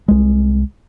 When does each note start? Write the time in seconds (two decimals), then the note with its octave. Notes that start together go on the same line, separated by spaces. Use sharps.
0.08 C2 G#3